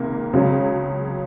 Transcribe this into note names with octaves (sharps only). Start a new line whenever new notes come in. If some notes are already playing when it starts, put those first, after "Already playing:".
Already playing: C#2 C3 D#3 A#3
C#2 C#3 F#3 C#4